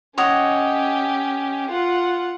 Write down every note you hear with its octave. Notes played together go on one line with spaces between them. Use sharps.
C#4 G4 C#5 D#5 F#5
F4 F#5